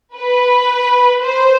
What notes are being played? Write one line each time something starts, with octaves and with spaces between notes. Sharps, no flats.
B4
C5